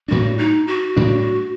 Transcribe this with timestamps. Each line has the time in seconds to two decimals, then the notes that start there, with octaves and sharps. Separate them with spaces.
0.08 A2 G3 D4 F#4
0.38 D#4
0.67 F#4
0.96 A2 G3 D4